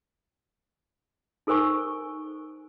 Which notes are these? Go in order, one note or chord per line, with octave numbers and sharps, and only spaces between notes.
D#4 A4 A#4 C5 G#5 C#6